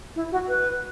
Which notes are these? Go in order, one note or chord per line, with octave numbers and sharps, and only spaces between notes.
E4
F#4
B4